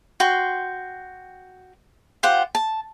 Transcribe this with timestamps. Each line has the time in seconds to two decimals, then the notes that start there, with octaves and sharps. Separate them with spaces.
0.20 F#4 G5 C6
2.23 F4 G4 C5 F#5
2.55 A5